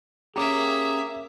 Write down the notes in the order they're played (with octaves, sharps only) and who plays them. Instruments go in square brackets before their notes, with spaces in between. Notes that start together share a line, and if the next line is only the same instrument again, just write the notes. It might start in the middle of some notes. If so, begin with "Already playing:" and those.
[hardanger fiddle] A#3 E5 [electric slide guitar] C#4 G4 [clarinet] G#4 [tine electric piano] A#5 D6